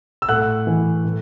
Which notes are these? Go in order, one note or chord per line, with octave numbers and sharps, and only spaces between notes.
E6
A2 F#5 F#6
E3
A2